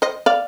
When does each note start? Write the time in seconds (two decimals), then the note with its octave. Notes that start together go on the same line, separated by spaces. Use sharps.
0.02 C5 D#5
0.26 D5 F5